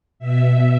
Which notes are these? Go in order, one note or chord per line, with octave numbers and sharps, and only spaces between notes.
B2 E5